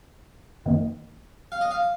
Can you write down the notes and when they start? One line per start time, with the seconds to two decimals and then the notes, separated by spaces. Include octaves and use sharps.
0.65 F#2 D#3 A#3 D#4
1.52 F5
1.61 D#5
1.71 F5